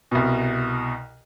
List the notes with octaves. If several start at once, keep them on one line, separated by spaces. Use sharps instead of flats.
C2 B2